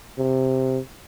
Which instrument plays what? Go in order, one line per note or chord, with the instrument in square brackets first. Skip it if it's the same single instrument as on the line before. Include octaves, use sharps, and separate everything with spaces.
[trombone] C3